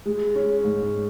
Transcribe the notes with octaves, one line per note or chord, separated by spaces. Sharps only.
G#3
C#4
G#2